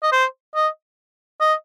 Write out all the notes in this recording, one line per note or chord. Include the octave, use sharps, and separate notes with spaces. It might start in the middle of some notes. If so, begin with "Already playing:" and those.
D#5
C5
D#5
D#5